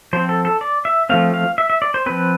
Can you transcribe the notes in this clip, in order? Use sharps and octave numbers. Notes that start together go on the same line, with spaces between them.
F3 C4 C5
A4
A4
D5
E5
F3 A3 C4 F5
F5
E5
E5
D5
C5
F3 C4 B4